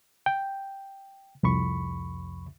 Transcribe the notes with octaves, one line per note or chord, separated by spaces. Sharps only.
G5
C2 F2 B5 C#6